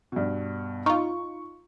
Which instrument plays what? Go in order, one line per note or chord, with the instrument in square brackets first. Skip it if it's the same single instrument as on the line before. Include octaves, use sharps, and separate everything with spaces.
[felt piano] G2 B2
[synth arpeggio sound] D#4 F4 [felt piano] C#6